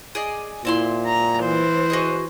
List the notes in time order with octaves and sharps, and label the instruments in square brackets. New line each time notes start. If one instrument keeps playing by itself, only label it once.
[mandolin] G#4 D5 D#5
[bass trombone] A#2 [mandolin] C4 E4 C6
[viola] A#5
E3 C5
[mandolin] F#4 G#4 D#5